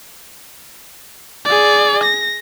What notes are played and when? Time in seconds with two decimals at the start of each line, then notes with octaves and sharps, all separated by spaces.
1.46 G#4 D5
2.04 A#6